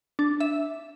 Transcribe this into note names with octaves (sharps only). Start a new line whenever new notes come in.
D4
E5